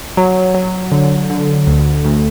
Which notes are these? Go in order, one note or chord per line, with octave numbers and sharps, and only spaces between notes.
F#3
F#3
D3
D3
D2
D2